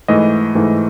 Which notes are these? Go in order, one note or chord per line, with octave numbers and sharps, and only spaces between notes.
G#2 E3 A3 D#5
G#2 E3 A3